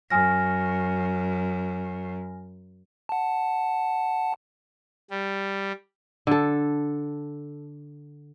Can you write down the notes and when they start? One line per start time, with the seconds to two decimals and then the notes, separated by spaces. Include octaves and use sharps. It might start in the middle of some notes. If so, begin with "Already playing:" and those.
0.10 F#2 G#5 F6 A#6
3.09 F#5 A5
5.10 G3
6.27 D3 A4